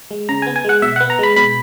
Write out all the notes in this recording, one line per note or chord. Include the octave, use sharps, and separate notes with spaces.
G#3
C#3 A#5
B3 G#5
G#5
G#3 F#5
B2 E5
B3 F#5
A#5
G#3 B5
B2 B5